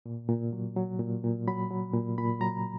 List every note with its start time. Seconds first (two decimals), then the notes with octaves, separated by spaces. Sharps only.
0.06 A#2
0.29 A#2
0.53 F#3
0.76 F#3
0.99 A#2
1.24 A#2
1.47 F#3 B5
1.71 F#3
1.94 A#2
2.18 A#2 B5
2.41 F#3 A#5